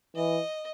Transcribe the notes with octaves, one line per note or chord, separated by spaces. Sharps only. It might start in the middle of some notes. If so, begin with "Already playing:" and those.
E3 D#5